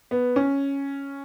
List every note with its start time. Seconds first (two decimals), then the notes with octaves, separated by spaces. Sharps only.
0.11 B3
0.36 C#4